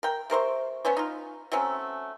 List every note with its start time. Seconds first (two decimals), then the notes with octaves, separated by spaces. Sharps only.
0.03 A#4 G5
0.30 C3 A#4 C5 C#6
0.85 B3 C#4 C5 C#5
0.97 D#4 F4
1.52 F#3 A3 C4 C#4